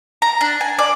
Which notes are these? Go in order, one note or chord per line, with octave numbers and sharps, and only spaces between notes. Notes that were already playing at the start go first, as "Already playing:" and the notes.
A#5
D4
G#5
D5